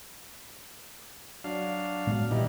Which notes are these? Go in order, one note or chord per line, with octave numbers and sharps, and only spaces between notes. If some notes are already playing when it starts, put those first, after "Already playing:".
F#3 D4 F5
A2 G#3 B3
A#2 E3 G3 D#4